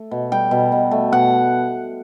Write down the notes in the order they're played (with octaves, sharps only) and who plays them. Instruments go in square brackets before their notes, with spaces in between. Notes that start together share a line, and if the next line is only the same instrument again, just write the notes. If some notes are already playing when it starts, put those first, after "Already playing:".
Already playing: [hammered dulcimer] A3
B2
G3 G5
B2
B2
A3
B2 F#5